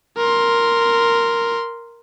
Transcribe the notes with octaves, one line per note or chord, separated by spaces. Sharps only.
A#4 C6